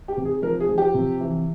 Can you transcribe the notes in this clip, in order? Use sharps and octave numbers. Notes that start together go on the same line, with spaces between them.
G4
C3
G#4
F3 A#4
G#4
F3
G4
C3
E3